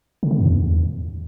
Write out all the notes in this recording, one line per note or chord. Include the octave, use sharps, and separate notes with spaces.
C#3
D3
F#2
E2